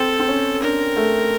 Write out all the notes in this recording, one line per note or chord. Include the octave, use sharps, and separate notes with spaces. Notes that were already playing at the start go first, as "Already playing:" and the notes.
Already playing: C4 A4
C4
C#4
D4 A#4
A3